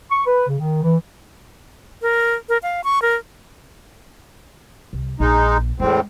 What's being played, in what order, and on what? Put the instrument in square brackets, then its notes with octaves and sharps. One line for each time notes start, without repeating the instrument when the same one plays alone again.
[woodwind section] C#6
B4
C#3
D#3
E3
[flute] A#4
A#4
F5
C#6
A#4
[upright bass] C2
[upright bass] A#1 [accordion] G#3 D#4
[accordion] E2 A2 C4 [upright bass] G#3 C#4